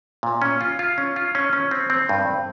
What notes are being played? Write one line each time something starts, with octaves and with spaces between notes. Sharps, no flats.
A#2
C#4
F4
F4
C#4
F4
C#4
C#4
C4
C4
G2